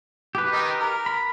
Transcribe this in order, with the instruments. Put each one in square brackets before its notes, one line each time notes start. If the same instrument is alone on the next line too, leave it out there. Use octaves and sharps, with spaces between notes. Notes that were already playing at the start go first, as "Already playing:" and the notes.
[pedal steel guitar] G4 B4
[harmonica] D#3 D#4
A#4
[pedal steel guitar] B5